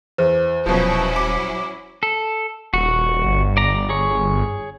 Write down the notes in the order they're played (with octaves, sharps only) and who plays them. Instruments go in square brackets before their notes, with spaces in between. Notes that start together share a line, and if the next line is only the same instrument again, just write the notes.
[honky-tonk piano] E2 [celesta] C5
[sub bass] D#1 [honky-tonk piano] B2 F3 [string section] F#3 C#4 E4
[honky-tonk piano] D6
[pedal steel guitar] A4
[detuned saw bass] D#1 [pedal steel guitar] F#4
[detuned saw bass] G1
[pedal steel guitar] D5 A#5
G#4 C#5